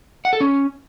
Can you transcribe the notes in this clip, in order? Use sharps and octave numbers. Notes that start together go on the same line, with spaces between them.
F#5
A4
C#4